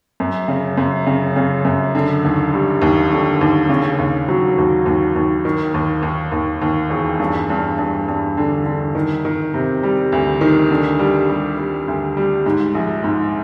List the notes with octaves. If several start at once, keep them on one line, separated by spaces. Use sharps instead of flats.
F#2
C#3
F#2
C#3
C#3
F#2
D3
D#2
G3
D#2
D3
D#2
C#3
D#2
F#3
D#2
D#2
D#2
D#3
D#2
D#2
D#2
D#2
E1
G2
G2
G2
G2
D3
D3
D#3
D#3
C3
G3
D2
D#3
D3
G3
G3
G3
D2
G3
G#2
A#1
G#2